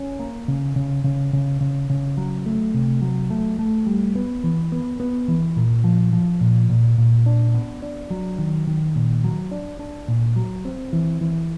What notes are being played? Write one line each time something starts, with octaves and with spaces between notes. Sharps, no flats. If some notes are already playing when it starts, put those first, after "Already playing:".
Already playing: C#4
A#3
C#3
C#3
C#3
C#3
C#3
C#3
F#3
A3
C3
F#3
A3
A3
G3
B3
E3
B3
B3
E3
A#2
F3
F3
A#2
A#2
A#2
D4
B3
D4
F#3
D#3
D#3
A#2
F#3
D4
D4
A#2
F#3
C4
E3
E3